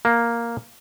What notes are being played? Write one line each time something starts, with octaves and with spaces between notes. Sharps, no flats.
A#3